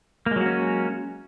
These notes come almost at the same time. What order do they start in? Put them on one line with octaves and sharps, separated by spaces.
A#3 G#3 F#3 F#4 C#4